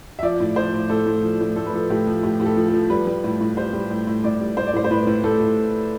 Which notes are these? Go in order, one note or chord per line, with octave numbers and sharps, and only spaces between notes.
E5
F3 D5
A2
F3 C5
A2
A2 A4
A2
F3
A2
A2 A4
B4
F3 A4
A2 G4
F3
A2 G4
A2 G4
A4
F3
A4
F3
G3 B4
G3
A2
A2
G3 C5
G3
A2
A2
A2 D5
G3
A2 C5
D5
A2 C5
C5
A2 B4
A2
A2 A4
A2